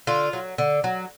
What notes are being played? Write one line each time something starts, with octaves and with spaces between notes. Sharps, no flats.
D3 F4
F#3
D3
F#3